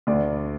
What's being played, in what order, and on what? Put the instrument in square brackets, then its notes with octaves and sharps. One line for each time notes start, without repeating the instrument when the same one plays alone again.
[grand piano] D2 D5